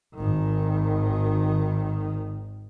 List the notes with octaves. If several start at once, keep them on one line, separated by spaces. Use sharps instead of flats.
G#1 D#3